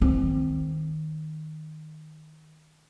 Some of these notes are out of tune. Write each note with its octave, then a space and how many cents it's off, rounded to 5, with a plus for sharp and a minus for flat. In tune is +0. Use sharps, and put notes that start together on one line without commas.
D#3 +0 C4 +0